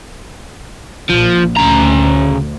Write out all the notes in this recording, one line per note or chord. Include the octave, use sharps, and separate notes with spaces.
A#1 F3
D2 C#3 A#5